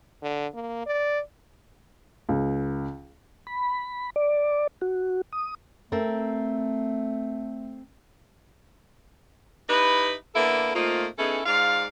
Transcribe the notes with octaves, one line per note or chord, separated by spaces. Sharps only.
D3
A#3
D5
C#2
B5
D5
F#4
D#6
A3 C4 A4 A#4
D#4 E4 G4 B4
D3 A#3 B3 E4 A4
A3 A#3 C4 D#4 F4
B3 C#4 D#4 E4 G#4 A4
G#2 F4 D5 F5